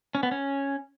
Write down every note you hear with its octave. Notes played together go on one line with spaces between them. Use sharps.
C#4
B3
C#4